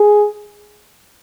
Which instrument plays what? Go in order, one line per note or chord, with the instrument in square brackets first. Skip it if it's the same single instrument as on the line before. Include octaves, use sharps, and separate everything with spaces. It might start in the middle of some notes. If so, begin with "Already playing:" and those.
Already playing: [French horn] G#4